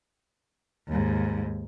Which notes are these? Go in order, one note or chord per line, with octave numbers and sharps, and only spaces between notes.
D#2 G#2